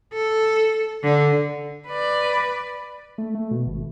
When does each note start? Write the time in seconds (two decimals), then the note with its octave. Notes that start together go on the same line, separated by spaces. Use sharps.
0.13 A4
1.03 D3
1.88 B4 D5
3.18 A3
3.35 A3
3.51 B2
3.67 G#1